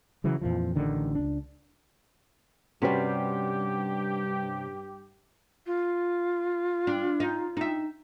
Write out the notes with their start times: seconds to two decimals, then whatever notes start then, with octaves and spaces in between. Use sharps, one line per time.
0.24 C#3 E3 F#3
0.41 F2 A#2 E3 F3
0.76 A1 D3 D#3
1.15 C#2 D4
2.82 G2 C3 G3 C#4 F#4 G4 B4
5.67 F4
6.87 D4
7.20 D#4
7.57 D#4 E5